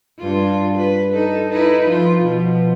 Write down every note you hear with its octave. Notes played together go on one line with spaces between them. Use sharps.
G2 F4
B4
D#4 A4
D#4 E4 B4
F3 F4
B2 F3